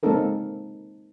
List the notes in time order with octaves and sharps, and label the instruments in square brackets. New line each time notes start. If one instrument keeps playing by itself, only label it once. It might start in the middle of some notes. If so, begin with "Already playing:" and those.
[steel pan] G#3 A#3 C4 D#4 A4 A#4